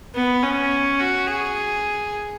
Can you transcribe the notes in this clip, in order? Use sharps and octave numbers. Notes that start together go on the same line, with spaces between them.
B3
C#4
F#4
G#4